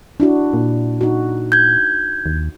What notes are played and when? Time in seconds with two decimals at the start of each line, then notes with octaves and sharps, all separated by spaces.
0.20 D4 E4 F#4
0.54 A#2
1.01 D#4 F#4
1.52 G6 G#6
2.26 D#2